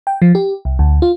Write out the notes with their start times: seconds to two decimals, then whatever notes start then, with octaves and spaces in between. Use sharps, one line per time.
0.07 G5
0.22 F3
0.35 G4
0.65 C2
0.79 D2
1.02 F4